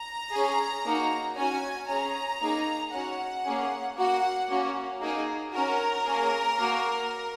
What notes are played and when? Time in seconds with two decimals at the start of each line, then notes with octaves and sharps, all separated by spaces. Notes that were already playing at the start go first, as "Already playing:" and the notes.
Already playing: A#5
0.32 C#4 G#4
0.85 A#3 D#4 F#4
1.36 C#4 F#4 G#5
1.88 C#4 G#4 A#5
2.40 A#3 D#4 G#4
2.92 C#4 F#4 F#5
3.45 A#3 C#4 G#4
3.97 A#3 F#4 F#5
4.49 A#3 C#4 F#4
5.01 A#3 D#4 G#4
5.53 C#4 F#4 A#4
6.05 A#3 C#4 G#4
6.58 A#3 F#4